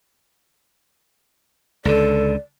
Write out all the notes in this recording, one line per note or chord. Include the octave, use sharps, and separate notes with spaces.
C#2 D3 A4 D5